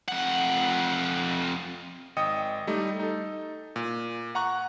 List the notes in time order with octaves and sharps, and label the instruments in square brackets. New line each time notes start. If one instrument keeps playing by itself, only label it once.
[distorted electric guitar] F2 F#5
[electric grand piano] G#1 D#5 G5 D#6 C#7
G3 A3 D#4
D#4 A4
A#2
F#5 A#5 C#6 F#6